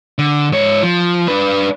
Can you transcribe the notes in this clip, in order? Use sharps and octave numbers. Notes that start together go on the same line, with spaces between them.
D3
G#2 C#5
F3
D4 B4